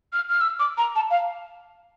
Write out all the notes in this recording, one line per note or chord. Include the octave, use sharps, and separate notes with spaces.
F6
F6
E6
D6
A#5
A5
F5